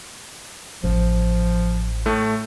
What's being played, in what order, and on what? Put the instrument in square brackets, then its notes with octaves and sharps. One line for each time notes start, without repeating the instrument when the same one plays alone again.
[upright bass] A1 [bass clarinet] F3
[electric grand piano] A2 A3